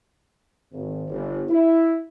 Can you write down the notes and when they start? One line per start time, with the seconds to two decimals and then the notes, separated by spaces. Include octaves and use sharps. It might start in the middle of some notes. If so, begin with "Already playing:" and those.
0.72 G#1
1.07 G1
1.49 E4